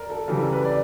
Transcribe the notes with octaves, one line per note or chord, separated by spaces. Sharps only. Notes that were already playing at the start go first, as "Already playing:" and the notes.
Already playing: A#4 D5
A4
C#3 E3 G3 A4
A#4
B4
D5